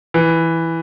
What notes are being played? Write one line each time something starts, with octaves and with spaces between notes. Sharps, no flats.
E3